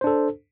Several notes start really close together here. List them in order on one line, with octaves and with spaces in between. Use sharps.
C5 D4 A4